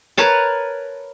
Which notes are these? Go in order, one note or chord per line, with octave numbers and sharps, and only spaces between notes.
A#4 B4 C#5 A5